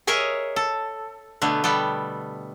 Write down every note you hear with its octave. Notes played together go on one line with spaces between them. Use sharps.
G#4 A#4 C#5 D#5 E5
A4
B2 D3 A3 B3
G3 B3 A4 G5